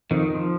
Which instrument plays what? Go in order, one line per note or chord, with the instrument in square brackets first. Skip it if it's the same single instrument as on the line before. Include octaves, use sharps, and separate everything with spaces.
[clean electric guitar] F2 [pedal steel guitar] D#3
[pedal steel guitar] F3